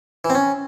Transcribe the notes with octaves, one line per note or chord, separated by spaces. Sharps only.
E3
C4
C#4